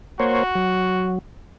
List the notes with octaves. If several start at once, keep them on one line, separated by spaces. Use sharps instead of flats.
A#3 F#4 C5 C#5
F#3